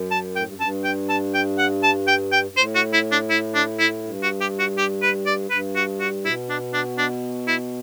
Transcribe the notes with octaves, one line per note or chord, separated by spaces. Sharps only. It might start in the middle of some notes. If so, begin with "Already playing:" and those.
Already playing: F#2
A5
A2 G5
G2
F#2
G2 A5
G5
A5
G5
F#5
A5
G5
G5
G2
A2 C5
F#4
E4
D4
E4
D4
E4
G2
F#4
G4
F#4
G4
B4
D5
G2 B4
F#4
F#4
B2 E4
D4
D4
D4
E4